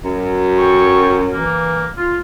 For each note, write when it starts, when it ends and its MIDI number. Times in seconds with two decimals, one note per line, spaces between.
0.04 1.50 42
0.59 1.20 69
0.59 1.20 79
0.59 1.20 85
1.33 1.87 52
1.33 1.87 58
1.98 2.19 65